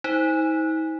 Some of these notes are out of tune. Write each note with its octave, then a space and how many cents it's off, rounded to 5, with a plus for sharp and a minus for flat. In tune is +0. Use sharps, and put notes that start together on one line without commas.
D#4 +45 C5 +0